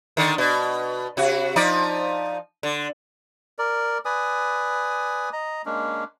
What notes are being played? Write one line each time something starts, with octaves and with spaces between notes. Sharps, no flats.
D3 D#3
B2
C3 F#4
F3 D#4 D5
D3
A#4 D5
B4 D5 G#5 D#6
D#5 A#5
G#3 A#3 C#4 D4